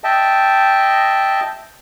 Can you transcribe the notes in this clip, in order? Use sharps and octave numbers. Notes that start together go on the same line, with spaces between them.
D#5 E5 G5 A5